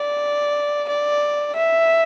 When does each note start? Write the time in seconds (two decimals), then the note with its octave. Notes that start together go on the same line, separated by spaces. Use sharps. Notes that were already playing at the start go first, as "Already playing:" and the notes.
Already playing: D5
0.88 D5
1.55 E5